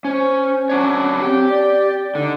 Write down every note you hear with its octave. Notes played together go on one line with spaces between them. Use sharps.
C#4 C5
F#3 C#4 D4 C#5
C4 G4
D5
D3 D#4